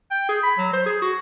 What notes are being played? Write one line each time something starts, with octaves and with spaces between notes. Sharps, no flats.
G5
G#4
B5
F#3
C5
G#4
F#4